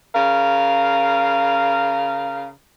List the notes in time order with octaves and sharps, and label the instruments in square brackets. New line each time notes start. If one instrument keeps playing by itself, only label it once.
[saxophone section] C#3 A#4 F5